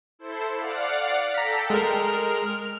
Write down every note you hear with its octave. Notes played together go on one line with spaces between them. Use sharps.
E4 A4 C5
D5 F5 F#5
A4 G5 A#5 B6
G#3 A#4 F6